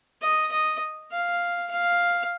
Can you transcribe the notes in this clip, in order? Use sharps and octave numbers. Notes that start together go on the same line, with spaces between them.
D#5
D#5
F5
F5